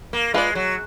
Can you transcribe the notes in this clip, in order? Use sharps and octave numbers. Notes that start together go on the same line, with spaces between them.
A#3
G#3 F4 B4 D5
F#3